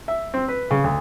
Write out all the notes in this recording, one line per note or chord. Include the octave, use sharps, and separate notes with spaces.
E5
C4
B4
C#3
D2